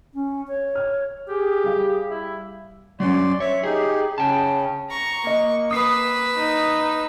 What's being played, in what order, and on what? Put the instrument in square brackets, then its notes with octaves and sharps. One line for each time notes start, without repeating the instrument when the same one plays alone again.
[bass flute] C#4
C#5
[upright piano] F6
[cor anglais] G4 [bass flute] G#4
[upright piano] G3 F5
[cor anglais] E4
[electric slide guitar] F#3 C#4 [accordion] D5 C6
[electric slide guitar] C#5 [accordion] E5
[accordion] D#4 G4 [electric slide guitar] G#4
[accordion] C#3 C#4 [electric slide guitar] G5 A5
[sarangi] A#5 [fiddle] C#6
[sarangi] A#3 [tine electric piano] D#5
[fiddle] B4 E6 [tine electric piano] D#6 C7
[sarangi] D#4